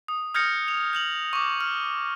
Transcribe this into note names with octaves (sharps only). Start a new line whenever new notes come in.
D#6
D#6 F6 G6 G#6 A#6 C#7
F7
G6 F7 F#7
C#6 D6
F6